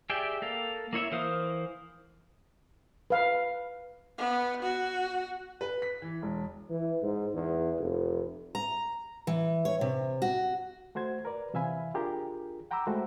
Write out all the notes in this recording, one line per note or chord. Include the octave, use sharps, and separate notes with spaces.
G4 G#4 D5 E5 G5
A#3 A4 F5
A#3 E4 C#5 E5
E3 A#4 C5 F5 D#6
B4 F5
B3
F#4
B4
B6
E3
E1
E3
G#2
E2
F1
A#5
E3
C#5
C3
F#4
A3 F#4 C5 G#6
A#4 B4 D5
C3 E3 E5 F5 G#5 B5
D4 F4 G4 G#4 A#4
F#5 G5 A#5 B5 D6 E6
G#3 A3 F#4 C5